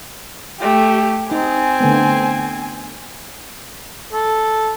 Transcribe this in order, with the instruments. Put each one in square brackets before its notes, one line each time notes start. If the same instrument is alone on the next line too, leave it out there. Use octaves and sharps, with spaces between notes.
[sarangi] A3 [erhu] G4
[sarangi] C4 [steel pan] D#4 [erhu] G#5
[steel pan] D3 A3 B3
[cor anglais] A4